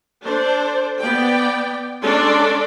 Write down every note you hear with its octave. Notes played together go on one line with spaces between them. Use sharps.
D4 A4 C5
B3 D5 G5
G#3 C#4 D4 A4 D5 C6